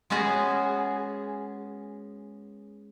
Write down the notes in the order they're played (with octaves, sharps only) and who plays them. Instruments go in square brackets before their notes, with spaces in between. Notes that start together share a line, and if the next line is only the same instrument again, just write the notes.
[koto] G#3 B3 C#4 F#4 G#4